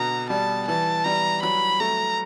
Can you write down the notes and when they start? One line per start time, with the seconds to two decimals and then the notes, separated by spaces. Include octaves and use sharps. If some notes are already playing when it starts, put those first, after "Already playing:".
Already playing: B2 D3 A#5
0.30 G3 A5
0.68 E3 A5
1.04 G3 A#5
1.43 F#3 B5
1.80 A3 A#5